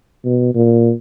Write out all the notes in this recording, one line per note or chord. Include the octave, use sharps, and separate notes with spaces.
B2
A#2